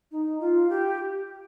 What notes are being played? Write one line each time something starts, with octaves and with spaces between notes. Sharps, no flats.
D#4
F4
G4